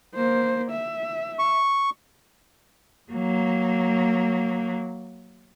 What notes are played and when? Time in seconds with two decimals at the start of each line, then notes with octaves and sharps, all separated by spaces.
0.15 A#3 C5
0.71 E5
1.39 C#6
3.12 F#3 A#3